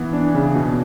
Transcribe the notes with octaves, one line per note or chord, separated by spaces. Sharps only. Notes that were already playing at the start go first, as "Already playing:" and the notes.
Already playing: E3 B3
D4
C#3
B2